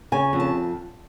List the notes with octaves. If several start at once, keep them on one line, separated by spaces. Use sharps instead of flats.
C#3 G#5
F2
A5